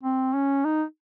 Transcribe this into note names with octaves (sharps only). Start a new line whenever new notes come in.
C4
C#4
D#4